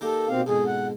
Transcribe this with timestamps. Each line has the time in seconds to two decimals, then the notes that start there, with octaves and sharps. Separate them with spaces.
0.01 D#3 A#3 G4 A4
0.29 B2 C4 F5
0.46 F2 G#2 B2 G#4
0.67 F#5